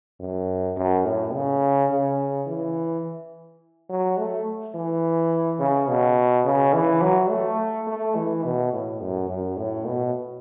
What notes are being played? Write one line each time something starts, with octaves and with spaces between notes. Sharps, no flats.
F#2
F#2
A2
C#3
C#3
E3
F#3
A3
E3
C#3
B2
C#3
E3
F#3
A3
A3
E3
B2
A2
F#2
F#2
A2
B2